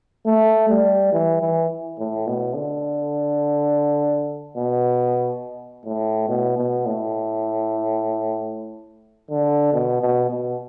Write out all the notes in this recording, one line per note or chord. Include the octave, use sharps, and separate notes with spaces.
A3
G3
E3
E3
A2
B2
D3
B2
A2
B2
B2
A2
D3
B2
B2
B2